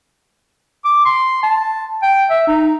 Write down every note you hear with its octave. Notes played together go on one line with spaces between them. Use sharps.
D6
C6
A5
G5
E5
D#4